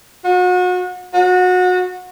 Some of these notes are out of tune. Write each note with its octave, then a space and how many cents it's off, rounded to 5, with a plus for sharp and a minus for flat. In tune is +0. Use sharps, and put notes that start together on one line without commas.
F#4 -35
F#4 -25